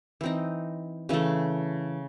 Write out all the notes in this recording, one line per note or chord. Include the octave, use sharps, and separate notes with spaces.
E3 C4 D#4
C#3 E3 A3